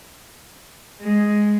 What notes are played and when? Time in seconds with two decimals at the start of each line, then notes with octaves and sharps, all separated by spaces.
1.02 G#3